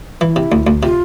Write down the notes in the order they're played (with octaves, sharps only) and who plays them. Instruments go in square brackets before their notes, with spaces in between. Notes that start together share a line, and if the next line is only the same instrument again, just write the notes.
[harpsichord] E3 [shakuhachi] E4 F4
[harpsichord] C3
D2
D2
[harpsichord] C3 [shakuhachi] F4